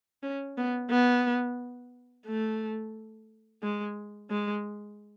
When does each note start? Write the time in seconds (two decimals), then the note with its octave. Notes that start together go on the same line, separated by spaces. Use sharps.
0.23 C#4
0.58 B3
0.90 B3
2.26 A3
3.62 G#3
4.30 G#3